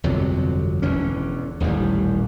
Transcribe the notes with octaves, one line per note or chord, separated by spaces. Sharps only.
G1 F2 C3 F#3
E1 E2 D3 C#4
D#1 A1 D#2 G3